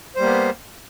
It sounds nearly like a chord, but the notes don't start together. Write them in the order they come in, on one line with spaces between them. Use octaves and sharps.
C5 G3 A#3 B3